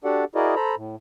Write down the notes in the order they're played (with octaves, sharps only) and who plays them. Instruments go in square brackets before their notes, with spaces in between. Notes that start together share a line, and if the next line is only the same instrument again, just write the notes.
[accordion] D4 F#4 G4 A4 D5 F#5
E4 F#4 G#4 A#4 D5 D#5
A4 C5 A#5 B5
A2